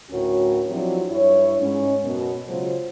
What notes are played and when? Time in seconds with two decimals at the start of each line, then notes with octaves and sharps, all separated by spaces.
0.10 D2 A2 C#4 F#4 A#4 C#5
0.68 F3 F#3 C4 D4 E4 G4
1.10 G2 E4 G4 C#5
1.60 G#2 G#3 C#4
2.02 F#2 B2
2.48 C#3 F#3 G#3 F4 C5